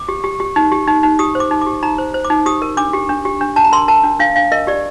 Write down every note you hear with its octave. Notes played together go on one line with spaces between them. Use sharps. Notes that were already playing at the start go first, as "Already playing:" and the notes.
Already playing: D6
G4
G4
G4
D#4
G4
D#4
D#4
G4 D#6
C5
D6
D#4
D6
G4
D#4 A#5
C5
C5
D6
D#4
G4 D#6
A#4
D4 D6
G4
D4
G4
D4
D4 A5
A#5
A#4 C6
A#4 A5
D4
D4 F5
D4 F5
A#4 D#5
G4 D5